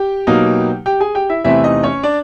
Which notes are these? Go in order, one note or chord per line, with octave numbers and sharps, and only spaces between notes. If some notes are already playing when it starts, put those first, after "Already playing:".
Already playing: G4 G5
B2 F#3 A#3 D#4
G4 G5
G#4 G#5
G4 G5
E4 E5
E2 C3 E3 A3 C4 E4 E5
D#4 D#5
C#4 C#5
D4 D5